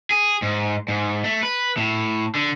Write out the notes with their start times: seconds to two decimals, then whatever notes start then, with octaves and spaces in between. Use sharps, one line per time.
0.11 G#4
0.42 G#2
0.88 G#2
1.24 A3
1.43 B4
1.77 A2
2.35 D3